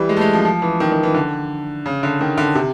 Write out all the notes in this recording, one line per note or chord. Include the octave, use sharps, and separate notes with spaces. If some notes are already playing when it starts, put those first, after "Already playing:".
Already playing: E3 G3
G#3
A3
G#3
F3
F3
E3
D#3
D#3
E3
D3
C#3
D3
D#3
D3
C3